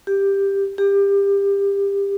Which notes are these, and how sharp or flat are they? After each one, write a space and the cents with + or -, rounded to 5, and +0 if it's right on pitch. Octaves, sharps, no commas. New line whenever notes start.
G4 +10
G4 +25